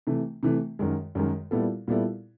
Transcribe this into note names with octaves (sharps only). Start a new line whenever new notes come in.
C3 E3 A3
C3 E3 A3
F#2 D#3 G#3
F#2 D#3 G#3
A#2 G3 B3 E4 A4
A#2 G3 B3 E4 A4